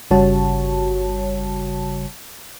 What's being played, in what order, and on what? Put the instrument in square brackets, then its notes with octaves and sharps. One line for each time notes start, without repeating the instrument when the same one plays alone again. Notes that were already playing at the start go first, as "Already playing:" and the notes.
[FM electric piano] G1 C#3 G3 F#4 C#5 A5